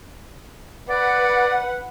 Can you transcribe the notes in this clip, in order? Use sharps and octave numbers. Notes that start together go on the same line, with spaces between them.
B4 D5 F#5